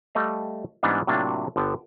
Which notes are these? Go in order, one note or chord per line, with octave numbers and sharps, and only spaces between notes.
G3 A3 D#5 F5
G#2 E3 G3 B3 C#4 D4
A2 C3 F#3 A#3 D4 F4
G1 D3 B3 G5 A5